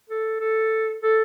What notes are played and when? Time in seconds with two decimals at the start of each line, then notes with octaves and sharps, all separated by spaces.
0.09 A4
0.40 A4
1.02 A4